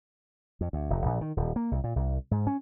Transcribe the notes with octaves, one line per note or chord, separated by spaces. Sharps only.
F2
D2
F1
A#1
D#3
D#1
A#3
C2
A#2
C2
G#2
C#4